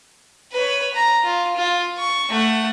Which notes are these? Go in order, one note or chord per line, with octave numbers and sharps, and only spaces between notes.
B4 C#5
A#5
F4
F4
C#6
A3 F#5